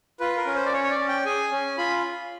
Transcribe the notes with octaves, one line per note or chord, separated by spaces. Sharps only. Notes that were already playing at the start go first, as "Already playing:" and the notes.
F4 B4
A#4
C#4
C5
D5
C#4 C#5
C#5
D5
C#4
G5
G#4 G#5
C#4
F4 B5